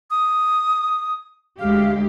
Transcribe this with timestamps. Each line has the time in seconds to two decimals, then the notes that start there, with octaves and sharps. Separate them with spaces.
0.10 D#6
1.59 D2 G#3 G4 F5